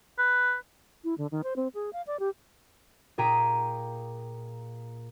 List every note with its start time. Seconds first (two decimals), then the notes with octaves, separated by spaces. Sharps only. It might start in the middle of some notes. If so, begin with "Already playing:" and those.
0.18 B4
1.04 E4
1.18 D3
1.31 D#3
1.44 C5
1.56 C4
1.74 G#4
1.93 F5
2.07 D5
2.19 G4
3.18 A#2 G#4 G5 A#5 B6 D#7